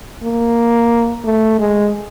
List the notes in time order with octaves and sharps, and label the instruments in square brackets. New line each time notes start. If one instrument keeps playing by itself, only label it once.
[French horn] A#3
A3
G#3